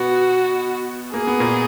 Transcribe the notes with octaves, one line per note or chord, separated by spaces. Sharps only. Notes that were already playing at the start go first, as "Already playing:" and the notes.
Already playing: B2 B3 F#4
A#3 G#4
B3
A#2 A#3